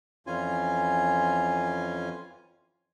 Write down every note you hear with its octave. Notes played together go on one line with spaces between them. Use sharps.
F2 E3 C#4 F4 G#5